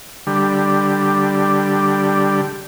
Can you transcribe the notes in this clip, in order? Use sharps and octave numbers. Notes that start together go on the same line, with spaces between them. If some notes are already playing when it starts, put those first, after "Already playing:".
D3 G3